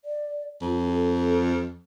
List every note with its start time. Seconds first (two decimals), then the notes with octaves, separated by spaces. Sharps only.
0.04 D5
0.62 F2 F4
0.91 A4